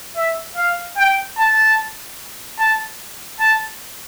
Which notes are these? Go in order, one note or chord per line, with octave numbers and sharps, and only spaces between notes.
E5
F5
G5
A5
A5
A5